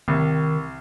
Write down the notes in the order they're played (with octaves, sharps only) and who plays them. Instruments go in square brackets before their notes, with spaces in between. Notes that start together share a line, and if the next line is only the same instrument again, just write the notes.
[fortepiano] C2 [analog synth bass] D#3